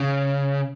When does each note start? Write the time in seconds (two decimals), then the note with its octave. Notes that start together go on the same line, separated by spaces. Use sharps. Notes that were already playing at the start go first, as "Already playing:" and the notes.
Already playing: C#3